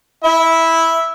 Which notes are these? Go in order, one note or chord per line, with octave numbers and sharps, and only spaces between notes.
E4 E5